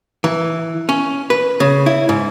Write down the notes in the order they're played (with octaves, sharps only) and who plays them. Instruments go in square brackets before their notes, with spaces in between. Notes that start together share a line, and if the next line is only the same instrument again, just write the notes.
[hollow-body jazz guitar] E3
C#4
B4
C#3
E4
G#2